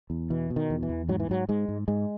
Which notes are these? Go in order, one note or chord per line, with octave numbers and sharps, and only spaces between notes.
E2
B2 E3
B2
D#3
E2
E3
E2
G#2 F#3
E3
G#2 F#3
G#2 G#3
G#2
G#2 G#3